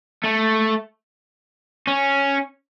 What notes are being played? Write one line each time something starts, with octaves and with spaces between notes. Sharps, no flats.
A3
C#4